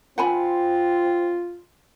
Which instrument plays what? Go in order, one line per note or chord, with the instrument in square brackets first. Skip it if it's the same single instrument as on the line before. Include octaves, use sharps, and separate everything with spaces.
[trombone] C4 [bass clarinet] F4 [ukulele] F#5 G#5 B5